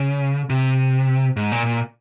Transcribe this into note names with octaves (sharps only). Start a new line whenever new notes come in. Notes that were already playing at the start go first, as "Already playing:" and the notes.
Already playing: C#3
C3
G#2
A#2
A#2